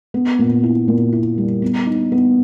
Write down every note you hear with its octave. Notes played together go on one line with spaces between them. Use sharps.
B3
A#2
E4
A#2
E4
G3
B3
D#4
B3